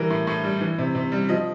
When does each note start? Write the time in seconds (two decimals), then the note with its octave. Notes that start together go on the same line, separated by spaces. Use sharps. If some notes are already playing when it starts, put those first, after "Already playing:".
Already playing: E3 G3 A#4
0.10 A2
0.27 A2
0.44 G3
0.61 E3
0.79 C3
0.95 C3
1.12 G3
1.29 F3 D#5